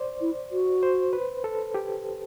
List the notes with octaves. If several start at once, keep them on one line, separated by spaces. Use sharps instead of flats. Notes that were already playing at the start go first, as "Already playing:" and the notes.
Already playing: C5 D5
E4
F#4
C5
B4
A4
G4